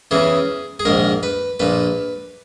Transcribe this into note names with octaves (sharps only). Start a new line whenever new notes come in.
E2 C#3 E3 G#4
G#4
A#1 G#2 D#3 A#4
B4
A#1 A#2 B4